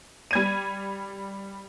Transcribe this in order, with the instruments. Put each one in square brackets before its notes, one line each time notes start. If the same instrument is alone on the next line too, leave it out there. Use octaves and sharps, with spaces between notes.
[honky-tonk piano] G3 G#6 D#7